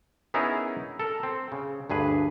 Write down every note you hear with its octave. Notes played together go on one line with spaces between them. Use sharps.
B3 C#4 D#4 E4 G#4 A#4
A4 A#4
C4
C#3
D2 G2 G#4 B4